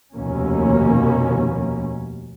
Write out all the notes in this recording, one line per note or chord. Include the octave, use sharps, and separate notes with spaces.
F1 D#2 B2 A#3 C#4